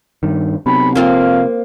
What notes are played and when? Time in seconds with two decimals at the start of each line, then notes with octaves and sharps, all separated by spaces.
0.23 G2 D#3
0.66 B1 C3 B5
0.95 F2 A#3 C4 F4 F5